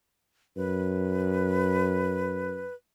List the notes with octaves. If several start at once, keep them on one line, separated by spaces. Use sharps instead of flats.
F#2 B4